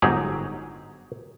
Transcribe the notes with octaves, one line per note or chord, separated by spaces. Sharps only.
G1 G#2 F#3 D#4 G4 G#4